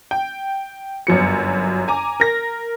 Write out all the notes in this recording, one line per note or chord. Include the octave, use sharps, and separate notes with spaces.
G5
G1 F#2 F#3 C#7
G#5 A#5 D6
A#4 A#6